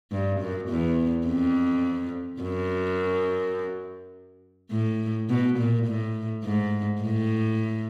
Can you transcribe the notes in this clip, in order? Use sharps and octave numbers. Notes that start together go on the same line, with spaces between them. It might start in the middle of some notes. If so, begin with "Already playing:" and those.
G2
F#2
E2
F2
F#2
A2
B2
A#2
A2
G#2
A2